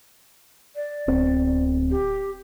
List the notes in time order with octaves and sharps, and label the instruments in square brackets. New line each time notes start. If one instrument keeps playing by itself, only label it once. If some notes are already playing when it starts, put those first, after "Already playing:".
[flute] D5
[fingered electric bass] D1 B3 C4
[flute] G4